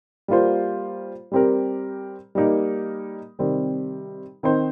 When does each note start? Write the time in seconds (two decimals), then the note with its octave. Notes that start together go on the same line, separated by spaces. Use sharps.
0.28 G3 A#3 F4 C5
1.32 G3 C4 G4 A#4
2.35 G3 A#3 D#4 A#4
3.39 C3 D#3 G3 C4
4.43 D#3 C4 D#4 C5